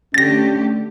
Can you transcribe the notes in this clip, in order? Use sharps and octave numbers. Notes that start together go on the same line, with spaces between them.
D3 A3 C#4 G4 A6 A#6